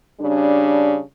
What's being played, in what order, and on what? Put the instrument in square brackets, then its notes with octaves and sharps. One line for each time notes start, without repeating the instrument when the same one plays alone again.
[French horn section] C#3 G3 D4